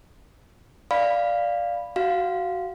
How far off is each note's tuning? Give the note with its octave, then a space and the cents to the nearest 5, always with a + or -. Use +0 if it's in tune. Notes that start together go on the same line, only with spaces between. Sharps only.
D5 +0 F5 +0 B5 +0
F#4 +15 F5 -5